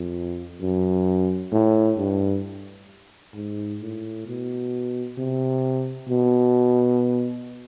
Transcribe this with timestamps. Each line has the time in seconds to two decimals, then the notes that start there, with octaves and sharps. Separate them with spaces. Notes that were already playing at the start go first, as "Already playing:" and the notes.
Already playing: F2
0.61 F#2
1.52 A2
1.98 G2
3.34 G#2
3.81 A2
4.27 B2
5.18 C3
6.08 B2